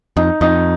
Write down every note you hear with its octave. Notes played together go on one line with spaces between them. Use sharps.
F2 D#4
F2 D#4